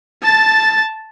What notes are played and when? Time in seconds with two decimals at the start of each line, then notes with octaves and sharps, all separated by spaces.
0.23 A5 A6